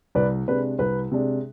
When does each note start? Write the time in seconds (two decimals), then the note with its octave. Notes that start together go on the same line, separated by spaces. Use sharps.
0.15 C2 B4 D5
0.48 C3 G#3 D4 B4
0.79 C2 B4
1.12 C3 G#3 D4